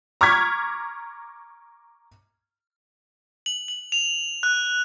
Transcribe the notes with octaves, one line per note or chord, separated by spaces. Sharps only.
A#5 C#6 D6 F6 G#6 B6
F#7
F#7
F7
F#6